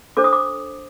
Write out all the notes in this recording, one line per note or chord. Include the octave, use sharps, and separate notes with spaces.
D4 A4 C5 D6
D#6
D6